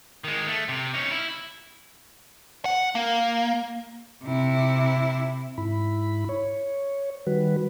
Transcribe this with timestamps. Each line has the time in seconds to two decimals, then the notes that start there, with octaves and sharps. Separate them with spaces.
0.24 D#3 G#3
0.48 A3
0.69 C3
0.94 C#4 D#4
1.11 E4
2.65 F#5
2.95 A#3
4.24 C3 E4
5.58 G#2 E4 B5
6.29 C#5
7.27 D#3 G3 F#4 B4